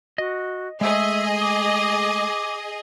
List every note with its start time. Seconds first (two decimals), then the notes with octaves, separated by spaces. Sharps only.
0.18 F#4 D#5
0.81 G#3 A3 G#4 D#5 E5
1.41 D6